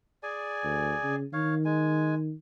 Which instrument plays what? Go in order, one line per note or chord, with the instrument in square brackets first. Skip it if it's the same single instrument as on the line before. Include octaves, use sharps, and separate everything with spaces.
[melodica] G#4 D5 G#5
[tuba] D2
C#3
[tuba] D#3 [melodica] C#5 F5
[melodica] G#3 G#5